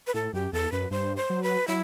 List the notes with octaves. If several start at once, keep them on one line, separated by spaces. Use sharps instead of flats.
B4
A2 A4
F#2 G4
E2 A4
F#2 B4
G2 C5
C5
F#3
B4
F#3 E4